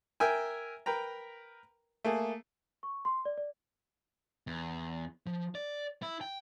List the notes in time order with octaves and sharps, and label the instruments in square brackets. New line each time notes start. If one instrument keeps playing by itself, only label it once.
[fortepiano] A#4 E5 G5 G#5
A#4 B4 G5 A#5
A3 A#3 G#4
[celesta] C#6
C6
D5
D5
[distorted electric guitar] E2
F3
D5
E4
G5